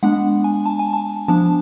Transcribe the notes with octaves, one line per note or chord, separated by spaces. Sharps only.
G#3 B3 D4 F#5
G#5
A5
G#5
A5
F3 B3 D4 A5